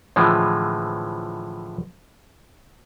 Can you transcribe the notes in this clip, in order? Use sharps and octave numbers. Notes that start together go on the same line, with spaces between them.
A2 D3 E3 F3 G#3